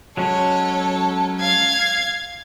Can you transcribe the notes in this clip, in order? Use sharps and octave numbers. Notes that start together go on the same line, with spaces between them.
F#3 G#3 C#4 A4 C#5
F5 G#6